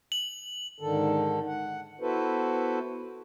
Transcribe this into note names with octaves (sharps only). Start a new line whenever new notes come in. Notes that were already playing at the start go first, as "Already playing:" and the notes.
F#7
G#2 D3 D#3 A4
F#5
B3 E4 F#4 A4 B4 C5